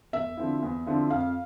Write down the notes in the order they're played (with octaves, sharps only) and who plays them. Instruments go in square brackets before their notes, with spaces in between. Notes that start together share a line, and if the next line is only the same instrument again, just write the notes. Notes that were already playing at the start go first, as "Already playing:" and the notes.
[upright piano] E2 [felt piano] E5
[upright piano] D3 F3 C4 E4
E2
D3 F3 C4 E4
[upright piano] F2 [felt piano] F5